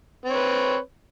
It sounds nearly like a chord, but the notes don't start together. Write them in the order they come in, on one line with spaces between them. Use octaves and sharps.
C4 C#5 B4